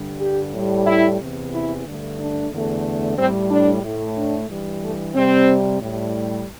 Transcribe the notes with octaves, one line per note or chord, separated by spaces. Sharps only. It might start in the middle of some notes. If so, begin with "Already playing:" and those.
Already playing: G2 D3 G3
G4
A2 G3
E4
E2 C3 E3
E4
G2 D3 A3
D4
E2 D3 A3
A2 G3 C4
D4
A2 A3
D4
G2 E3 G3
A3
C3 G3 C4
A2 G3